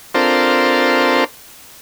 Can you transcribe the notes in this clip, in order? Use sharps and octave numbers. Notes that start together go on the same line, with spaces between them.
C4 D4 F4 A4 A#4 C5